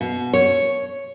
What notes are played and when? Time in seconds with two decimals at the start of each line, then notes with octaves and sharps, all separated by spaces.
0.01 B2
0.33 C#5